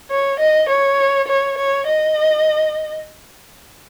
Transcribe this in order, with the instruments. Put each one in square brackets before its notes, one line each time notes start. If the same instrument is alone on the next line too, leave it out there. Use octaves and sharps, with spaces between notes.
[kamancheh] C#5
D#5
C#5
C#5
C#5
D#5